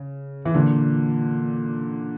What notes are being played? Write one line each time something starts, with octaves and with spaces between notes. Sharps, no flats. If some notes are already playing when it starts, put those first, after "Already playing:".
Already playing: C#3
E3
A#2 D3